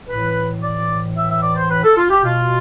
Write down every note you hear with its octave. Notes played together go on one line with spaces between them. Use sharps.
A2 E3 B4
D5
E5
E5
D5
C5
B4
A4
F4
G4
B2 F4